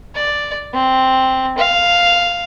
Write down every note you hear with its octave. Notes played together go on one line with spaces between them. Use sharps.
D5
C4
F5